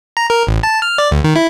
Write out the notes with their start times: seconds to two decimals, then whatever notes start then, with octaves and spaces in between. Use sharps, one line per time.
0.17 A#5
0.30 A#4
0.47 A1
0.63 A5
0.82 F6
0.98 D5
1.11 D2
1.24 D#3
1.36 E4